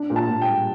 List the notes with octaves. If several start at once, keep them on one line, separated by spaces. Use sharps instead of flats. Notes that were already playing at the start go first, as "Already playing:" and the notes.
Already playing: D4
A#2
A5
A#2
G5
G3